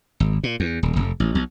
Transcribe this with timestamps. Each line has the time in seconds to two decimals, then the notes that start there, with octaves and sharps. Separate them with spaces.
0.20 G#1
0.43 A#2
0.60 E2
0.83 D#1
0.96 F1
1.20 A1
1.35 B1